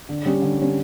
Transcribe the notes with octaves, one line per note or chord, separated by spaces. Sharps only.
D3
G3 C#4
D3
G3 C#4